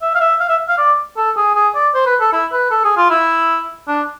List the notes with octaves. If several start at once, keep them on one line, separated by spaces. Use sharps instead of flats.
E5
F5
E5
F5
E5
F5
D5
A4
G#4
G#4
D5
C5
B4
A4
E4
B4
A4
G#4
F4
E4
D4